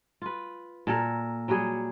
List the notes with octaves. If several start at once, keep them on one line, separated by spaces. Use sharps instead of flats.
F4 B4
A#2 A4 A#4
F#3 G3 F#4 G#4